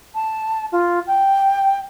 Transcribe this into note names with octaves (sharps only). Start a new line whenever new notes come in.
A5
F4
G5